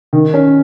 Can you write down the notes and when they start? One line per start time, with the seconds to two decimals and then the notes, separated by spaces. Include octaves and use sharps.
0.13 D#3
0.34 C#4